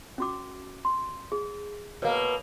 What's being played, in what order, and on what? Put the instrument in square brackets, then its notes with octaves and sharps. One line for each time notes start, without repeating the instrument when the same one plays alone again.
[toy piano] C#4 F#4 D6
C6
G#4
[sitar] B2 A#3 [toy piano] C#5